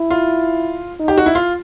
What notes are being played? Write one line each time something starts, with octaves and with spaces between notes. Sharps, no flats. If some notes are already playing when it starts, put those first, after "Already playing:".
Already playing: E4
F4
D#4
G4
F#4
E4
F4